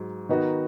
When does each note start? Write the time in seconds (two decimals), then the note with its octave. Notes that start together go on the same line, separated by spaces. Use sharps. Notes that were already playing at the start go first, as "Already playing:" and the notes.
Already playing: G#2 F#3 F#4
0.29 D#3 B3 D#4 F#4